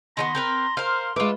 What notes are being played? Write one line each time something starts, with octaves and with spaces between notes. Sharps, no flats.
D#3 G3 B3 A#5 C6
C4 A#4 B4
A#4 C5 F5
G#3 A3 F4 B4 D6